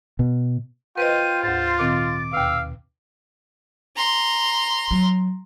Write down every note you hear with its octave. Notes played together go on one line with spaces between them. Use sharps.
B2
F4 B4 C5 D#5 G5 D#7
D2 G#2 C5 A6
A#2 D#3 C4 D6
D#2 B2 F5 E6
A#5 C6
F#3